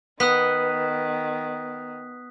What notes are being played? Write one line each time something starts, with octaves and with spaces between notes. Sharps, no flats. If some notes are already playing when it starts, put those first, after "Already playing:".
D#3 B3 D#6 F#6 B6